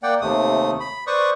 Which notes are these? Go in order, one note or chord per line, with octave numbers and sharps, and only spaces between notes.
A#3 D5 F#5 G5
D#2 C3 A3 D#6
B5
B4 C5 D5 C#6 D#6